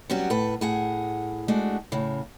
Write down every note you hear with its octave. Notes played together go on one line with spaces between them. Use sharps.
F#3 G3 B3 C#4 F#4 G4
A2 A4 B4
A2 G#4 F#5
G#3 A3 D4 F#4
A2 C#3